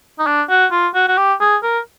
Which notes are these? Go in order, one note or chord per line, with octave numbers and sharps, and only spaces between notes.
D#4
D4
F#4
F4
F#4
F#4
G4
G#4
A#4